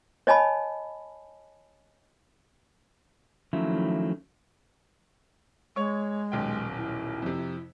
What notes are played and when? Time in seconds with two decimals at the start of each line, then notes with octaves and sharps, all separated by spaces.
0.27 C#5 D#5 G#5 A5 B5
3.53 D#3 F3 F#3 A3 C#4 E4
5.76 G#3 C#5 C#6
6.32 D#1 B1 G5
6.77 E4
7.22 F2 C3